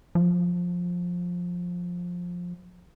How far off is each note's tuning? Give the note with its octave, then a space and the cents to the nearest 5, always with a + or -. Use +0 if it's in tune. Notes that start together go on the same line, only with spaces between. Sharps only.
F3 +15